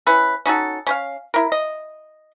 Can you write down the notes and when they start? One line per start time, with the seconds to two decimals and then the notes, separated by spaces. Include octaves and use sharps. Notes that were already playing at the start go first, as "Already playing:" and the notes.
0.07 C#4 E4 B4
0.46 C#4 D#4 F#4 A4
0.87 C#4 C5 F5
1.34 E4 A#4
1.52 D#5